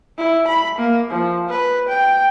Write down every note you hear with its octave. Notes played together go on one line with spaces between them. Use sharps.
E4
B5
A#3
F3
B4
G5